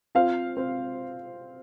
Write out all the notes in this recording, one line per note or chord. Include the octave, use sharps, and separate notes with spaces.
C4 F4 F5
C4